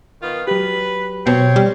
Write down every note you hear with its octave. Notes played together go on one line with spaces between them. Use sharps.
D#3 B3 F4
F#3 G4 B4
B2 C4 C#5
G3